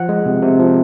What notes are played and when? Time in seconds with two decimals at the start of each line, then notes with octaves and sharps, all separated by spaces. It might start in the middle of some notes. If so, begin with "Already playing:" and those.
Already playing: F3 F#5
0.09 G#3
0.26 C3
0.43 C3
0.59 F3